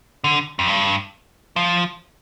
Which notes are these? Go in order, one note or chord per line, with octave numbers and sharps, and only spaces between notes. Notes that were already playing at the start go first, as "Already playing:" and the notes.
D3
F2
G2
F3